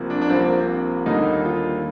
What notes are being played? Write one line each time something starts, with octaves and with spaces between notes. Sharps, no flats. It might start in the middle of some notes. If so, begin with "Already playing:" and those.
Already playing: C2 C3 F3 A#3
D4
D4
C2 C3 F3 A#3 C4
D#2 D3 G3 A#3 D#4
F4